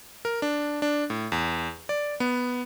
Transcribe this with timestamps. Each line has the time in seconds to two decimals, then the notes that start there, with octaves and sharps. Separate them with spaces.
0.25 A#4
0.42 D4
0.82 D4
1.10 A2
1.32 E2
1.89 D5
2.20 B3